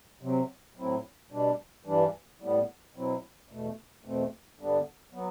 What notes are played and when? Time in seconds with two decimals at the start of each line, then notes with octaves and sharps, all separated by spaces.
0.21 C3 F#3 C4
0.76 A2 F#3 C4 E4
1.30 B2 G3 D4
1.86 G2 E3 G3 D4
2.40 A2 G3 B3
2.95 B2 F#3 C4 E4
3.49 E2 B2 A3
4.04 E2 B2 A3 C4
4.59 G2 D3 G3 B3 D4
5.13 F#3 B3